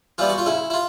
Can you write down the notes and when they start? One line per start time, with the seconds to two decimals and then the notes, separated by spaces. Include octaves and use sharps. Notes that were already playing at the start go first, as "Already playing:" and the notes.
0.18 E3 G3 B3 F4
0.29 F#4
0.38 F4
0.46 C#3 E4
0.70 E4
0.74 F4